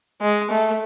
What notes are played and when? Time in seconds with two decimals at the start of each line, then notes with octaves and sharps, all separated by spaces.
0.21 G#3
0.50 A3